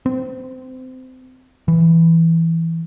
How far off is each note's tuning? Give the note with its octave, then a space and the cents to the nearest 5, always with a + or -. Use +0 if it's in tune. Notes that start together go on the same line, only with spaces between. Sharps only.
C4 -25
E3 +0